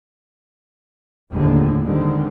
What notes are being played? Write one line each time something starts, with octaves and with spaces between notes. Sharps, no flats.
F1 D#2 A2 D3 G#3
D3 D#3 G3 G#3 C4